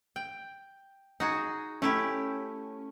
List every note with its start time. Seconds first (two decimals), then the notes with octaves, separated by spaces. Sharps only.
0.16 G5
1.20 D#4 F#4 G#4
1.82 A3 C#4 E4 G4